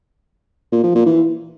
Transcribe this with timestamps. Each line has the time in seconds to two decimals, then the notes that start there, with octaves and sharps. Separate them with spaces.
0.72 A#2
0.84 F3
0.95 A#2
1.06 E3